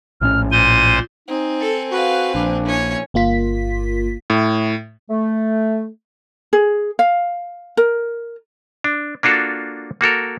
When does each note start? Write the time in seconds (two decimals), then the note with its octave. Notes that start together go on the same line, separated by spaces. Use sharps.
0.21 A#1 A2 C#4 F6
0.52 A#2 C5 C6 D#7
1.28 C4 D#4 G#5
1.60 A4
1.91 F#4 B4 F5
2.35 A#1 D4
2.66 C#4 E4 C#5 G#5
3.14 G1 A#3 F4 B6
4.30 A2
5.10 A3
6.53 G#4
6.99 F5
7.77 A#4
8.84 D4
9.23 A#3 D4 F4 F#4 A4
10.01 A#3 F#4 A4 A#4